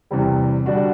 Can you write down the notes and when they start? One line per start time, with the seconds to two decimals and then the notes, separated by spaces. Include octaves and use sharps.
0.11 E2 C3 G3
0.66 D3 G3 D4 F#4